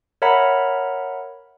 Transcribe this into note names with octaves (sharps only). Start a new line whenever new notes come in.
A#4 C#5 E5 F#5 A#5 B5